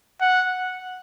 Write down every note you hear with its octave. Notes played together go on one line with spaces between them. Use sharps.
F#5